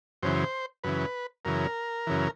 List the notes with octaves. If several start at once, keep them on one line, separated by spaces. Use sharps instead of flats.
F#2 C#3 E3 C5
F#2 C#3 E3 B4
F#2 C#3 E3 A#4
F#2 C#3 E3